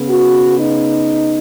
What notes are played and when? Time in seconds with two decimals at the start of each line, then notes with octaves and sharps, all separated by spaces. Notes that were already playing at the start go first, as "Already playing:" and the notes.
Already playing: C#3 B3
0.09 F#4
0.59 D#4